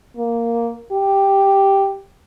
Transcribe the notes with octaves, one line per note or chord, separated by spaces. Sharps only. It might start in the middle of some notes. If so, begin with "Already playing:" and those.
A#3
G4